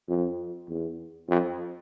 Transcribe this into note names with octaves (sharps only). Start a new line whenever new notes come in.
F2
E2
F2